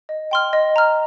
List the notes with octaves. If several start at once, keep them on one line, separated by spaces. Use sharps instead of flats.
D#5
G5 C6 F6
D#5
A#5 F6